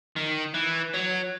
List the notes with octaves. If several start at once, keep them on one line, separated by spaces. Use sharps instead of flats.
D#3
E3
F#3